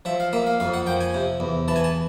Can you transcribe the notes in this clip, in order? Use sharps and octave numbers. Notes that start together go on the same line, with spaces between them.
F3 E5
F5
A#3 E5
F5
F2 F5
F#5
F3 G5
G#5
C3
E2
E3 A5
G#5
A5